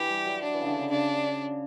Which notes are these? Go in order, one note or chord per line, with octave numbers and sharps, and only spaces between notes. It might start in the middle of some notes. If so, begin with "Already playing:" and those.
Already playing: E3 G4
G3
F#3
F#3 D4
E3
C#3
D3
C#3
C#3 D4